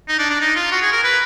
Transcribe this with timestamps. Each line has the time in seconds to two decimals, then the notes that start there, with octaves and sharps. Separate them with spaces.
0.08 D#4
0.19 D4
0.30 D4
0.41 D#4
0.56 F4
0.72 F#4
0.82 G#4
0.92 A#4
1.04 B4